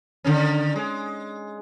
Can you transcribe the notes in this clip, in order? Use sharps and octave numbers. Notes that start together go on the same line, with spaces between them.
D3 D#3 C#4
G#3